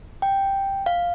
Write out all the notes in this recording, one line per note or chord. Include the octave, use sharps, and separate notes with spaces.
G5
F5